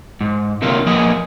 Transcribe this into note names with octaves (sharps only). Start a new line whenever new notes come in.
G#2
D2 C3 D#3 F#3 A#3 F4
F3 A#3 B3 G#4 A#4 D#5